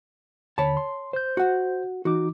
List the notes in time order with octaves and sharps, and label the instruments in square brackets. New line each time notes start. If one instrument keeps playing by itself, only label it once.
[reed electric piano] D#2 D3 B5 [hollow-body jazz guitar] C#5 A5
[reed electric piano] C6
C5 G6
[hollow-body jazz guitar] F#4 F#5
[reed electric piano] E3 D#4 D6 [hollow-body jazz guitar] F#4